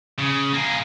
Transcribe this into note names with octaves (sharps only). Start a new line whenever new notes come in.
C#3
A#3 G#4